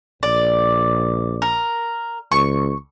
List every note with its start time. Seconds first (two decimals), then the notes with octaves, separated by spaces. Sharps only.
0.23 A#1 D5
1.42 A#4
2.32 C#2 C#6